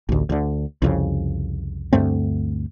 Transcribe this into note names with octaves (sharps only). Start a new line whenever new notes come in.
A1 D2
D2 D3
C2 F2 C#3
D2 G2 A3 C4